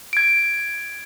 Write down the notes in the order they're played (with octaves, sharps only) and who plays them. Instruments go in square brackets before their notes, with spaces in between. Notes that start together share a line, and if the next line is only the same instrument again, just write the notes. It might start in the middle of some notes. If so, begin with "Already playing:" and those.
[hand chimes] G#6 D7